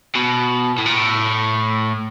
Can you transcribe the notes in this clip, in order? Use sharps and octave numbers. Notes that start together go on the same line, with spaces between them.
B2
A2
A#2
A2